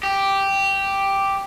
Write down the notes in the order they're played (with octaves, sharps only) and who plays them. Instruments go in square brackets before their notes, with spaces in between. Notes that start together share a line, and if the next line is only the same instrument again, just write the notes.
[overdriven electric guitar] G4